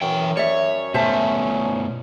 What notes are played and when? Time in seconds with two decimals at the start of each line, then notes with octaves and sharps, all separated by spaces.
0.01 F#2 E3 G5
0.37 C#5 D5 E5
0.94 B2 A3 C#4 C5 E5 A5